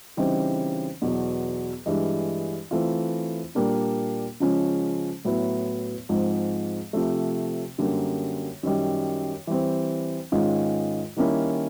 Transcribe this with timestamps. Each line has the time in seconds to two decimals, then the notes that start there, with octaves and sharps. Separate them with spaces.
0.17 C#3 E3 G3 C4 D#4
1.02 E2 B2 F#3
1.86 G2 E3 G#3
2.71 E3 A3 C4 F4
3.55 A#2 G3 A#3 D4
4.40 C#3 F3 G#3 C#4
5.25 A2 F#3 B3 E4
6.09 G#2 F3 G#3 C4
6.93 C3 F3 A3
7.78 F#2 D3 G3 A#3
8.63 F#2 D#3 G3
9.47 E3 G3 C4
10.32 G#2 D#3 G#3 C#4 F4
11.17 D#3 G3 A#3 C#4 E4